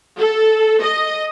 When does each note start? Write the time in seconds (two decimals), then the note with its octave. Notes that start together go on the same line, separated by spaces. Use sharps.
0.18 A4
0.81 D#5